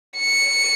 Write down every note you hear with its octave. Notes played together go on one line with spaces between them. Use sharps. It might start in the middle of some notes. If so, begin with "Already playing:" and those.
C#7